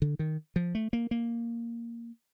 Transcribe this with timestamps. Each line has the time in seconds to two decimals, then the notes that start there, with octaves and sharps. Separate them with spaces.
0.02 D3
0.19 D#3
0.56 F3
0.75 A3
0.93 A#3
1.11 A#3